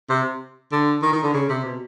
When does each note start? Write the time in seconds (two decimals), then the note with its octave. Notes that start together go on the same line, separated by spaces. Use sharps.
0.10 C3
0.72 D3
1.03 D#3
1.13 D#3
1.23 D3
1.34 C#3
1.49 C3
1.65 B2